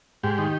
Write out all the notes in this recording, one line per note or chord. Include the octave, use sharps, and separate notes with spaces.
G#2 G4
D#3